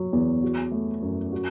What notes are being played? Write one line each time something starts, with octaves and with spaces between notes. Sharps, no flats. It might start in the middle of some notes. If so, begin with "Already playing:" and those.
Already playing: F#3
E2
F#4
A3
F#2
F#4